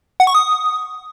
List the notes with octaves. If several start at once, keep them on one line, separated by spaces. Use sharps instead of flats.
F#5
C#6
D#6